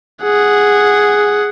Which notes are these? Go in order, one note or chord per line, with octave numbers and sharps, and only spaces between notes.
G#4 F#5